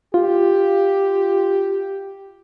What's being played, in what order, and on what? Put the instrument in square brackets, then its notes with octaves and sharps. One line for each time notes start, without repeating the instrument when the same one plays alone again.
[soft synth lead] F4 [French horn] G4